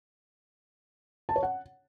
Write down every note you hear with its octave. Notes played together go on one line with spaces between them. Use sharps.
A5
C#5
F#5